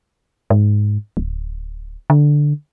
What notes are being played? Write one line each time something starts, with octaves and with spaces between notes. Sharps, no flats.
G#2
D1
D3